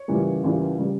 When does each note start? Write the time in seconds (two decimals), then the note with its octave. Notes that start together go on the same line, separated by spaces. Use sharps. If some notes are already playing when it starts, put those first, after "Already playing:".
Already playing: C#5
0.08 C#2 C#3 E3 G3 A#3
0.44 C#2 C#3 E3 G3 A#3
0.79 C#3 G3